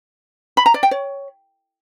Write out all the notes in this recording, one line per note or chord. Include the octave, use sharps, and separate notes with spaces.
B5
A#5
D5
G5
C#5